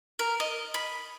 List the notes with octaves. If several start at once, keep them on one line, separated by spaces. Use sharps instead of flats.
A#4
D#5
B5